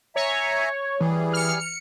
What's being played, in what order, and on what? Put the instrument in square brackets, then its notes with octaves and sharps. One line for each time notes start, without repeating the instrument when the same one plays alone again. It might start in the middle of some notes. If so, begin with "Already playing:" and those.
[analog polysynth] C#5 [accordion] E5 G#5 A#5
[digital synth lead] E3 [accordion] G3 G#4
[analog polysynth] F6 C#7
C#7